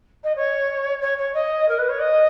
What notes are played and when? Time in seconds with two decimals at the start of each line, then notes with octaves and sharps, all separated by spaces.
0.24 D#5
0.36 C#5
1.01 C#5
1.18 C#5
1.34 D#5
1.69 A#4
1.79 B4
1.89 C#5
2.00 D#5